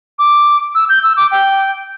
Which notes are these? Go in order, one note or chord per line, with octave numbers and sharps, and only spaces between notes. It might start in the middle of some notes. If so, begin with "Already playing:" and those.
D6
E6
G6
E6
D6
G5